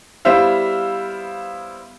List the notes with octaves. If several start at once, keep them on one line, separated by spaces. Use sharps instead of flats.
G3 B3 E4 C5 E5 F5